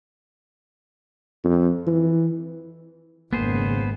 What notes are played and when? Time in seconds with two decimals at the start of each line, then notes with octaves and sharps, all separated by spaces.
1.44 F2
1.87 E3
3.33 G#1 F2 C#3 A#3 B3 G#4 C5